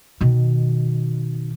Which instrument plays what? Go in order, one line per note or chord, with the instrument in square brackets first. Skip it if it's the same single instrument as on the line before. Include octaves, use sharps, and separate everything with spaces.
[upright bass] B2 D#3